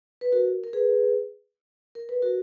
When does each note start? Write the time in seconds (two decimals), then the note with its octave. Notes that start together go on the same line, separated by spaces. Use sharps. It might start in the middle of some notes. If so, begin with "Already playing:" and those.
0.21 B4
0.32 F#4 A#4
0.64 A#4
0.73 G#4 B4
1.95 A#4
2.09 B4
2.22 F#4 A#4